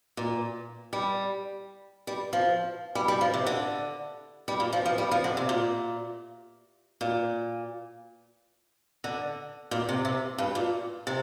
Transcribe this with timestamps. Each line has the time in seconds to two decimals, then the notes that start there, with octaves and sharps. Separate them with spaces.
0.17 A#2
0.93 G3
2.07 G3
2.33 F3
2.95 G3
3.08 G3
3.21 F3
3.34 C3
3.47 D3
4.48 G3
4.60 A#2
4.73 F3
4.86 F3
4.98 G3
5.11 F3
5.24 D3
5.37 C3
5.49 A#2
7.01 A#2
9.04 D3
9.71 A#2
9.89 C3
10.05 C3
10.38 G2
10.55 A#2
11.07 C3